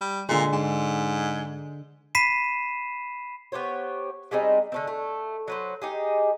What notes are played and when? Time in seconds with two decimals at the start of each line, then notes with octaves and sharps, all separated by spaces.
0.01 G3
0.29 A#2 D3 G#3
0.52 G#2
2.15 B5 B6 C7 D#7 E7
3.52 B3 G4 C5 C#5
4.31 G3 G#3 C4 D#4
4.72 D3 A3 C4
4.87 A3
5.48 F#3 B4 C5
5.82 D#4 G4 G#4